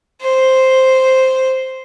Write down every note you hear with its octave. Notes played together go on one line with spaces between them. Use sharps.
C5